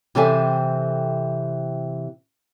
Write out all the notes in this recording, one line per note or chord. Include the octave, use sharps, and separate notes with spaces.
C3 E3 C4 A4 E5 G#5